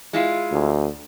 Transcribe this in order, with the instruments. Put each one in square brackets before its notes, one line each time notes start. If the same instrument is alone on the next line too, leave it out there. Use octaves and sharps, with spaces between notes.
[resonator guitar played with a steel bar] G#3 E4 F4
[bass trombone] D2